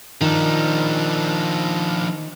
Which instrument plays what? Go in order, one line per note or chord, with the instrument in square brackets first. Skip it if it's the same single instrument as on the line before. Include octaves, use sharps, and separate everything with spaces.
[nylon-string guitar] D#3 [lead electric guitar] F3 D4